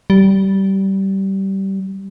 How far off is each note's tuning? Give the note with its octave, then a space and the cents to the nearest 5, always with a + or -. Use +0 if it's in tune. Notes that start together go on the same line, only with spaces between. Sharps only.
G3 -20